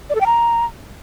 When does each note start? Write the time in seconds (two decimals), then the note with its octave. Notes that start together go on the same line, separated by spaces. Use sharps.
0.10 D5
0.15 A4
0.21 G5
0.26 A#5